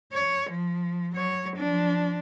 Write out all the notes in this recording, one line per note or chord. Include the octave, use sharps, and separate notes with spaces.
C#5
F3
F#3 C#5
F3 D4